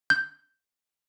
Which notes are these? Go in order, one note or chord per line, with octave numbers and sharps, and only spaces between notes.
G6